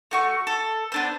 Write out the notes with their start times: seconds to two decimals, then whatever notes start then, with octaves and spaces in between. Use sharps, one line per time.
0.11 A3 F#4 C#6
0.47 A4
0.92 B3 D4 C5